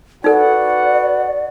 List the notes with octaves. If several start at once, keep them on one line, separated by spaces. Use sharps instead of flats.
D#4 F#4 A4 B4 D5 F#5